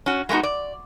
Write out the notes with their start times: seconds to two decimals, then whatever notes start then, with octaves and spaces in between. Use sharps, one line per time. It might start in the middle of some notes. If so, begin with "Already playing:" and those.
0.06 C#4 F#4
0.29 G#3 A3 B3 D#4 F#4
0.43 D5